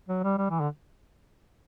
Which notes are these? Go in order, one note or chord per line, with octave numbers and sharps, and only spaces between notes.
F#3
G3
G3
E3
D3